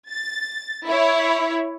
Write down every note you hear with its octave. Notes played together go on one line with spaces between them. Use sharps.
A6
E4 C#5